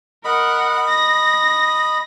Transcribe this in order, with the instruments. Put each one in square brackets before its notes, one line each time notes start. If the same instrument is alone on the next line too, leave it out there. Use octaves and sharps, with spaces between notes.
[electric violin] A#4 F#5 [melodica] D#5 B5
[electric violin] A#6